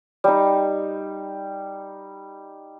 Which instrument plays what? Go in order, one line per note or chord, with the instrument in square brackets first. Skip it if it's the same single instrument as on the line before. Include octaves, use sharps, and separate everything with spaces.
[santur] G3 D#4